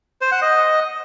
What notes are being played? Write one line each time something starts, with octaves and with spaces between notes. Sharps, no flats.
C5
F#5
D#5